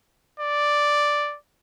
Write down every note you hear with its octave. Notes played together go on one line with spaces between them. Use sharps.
D5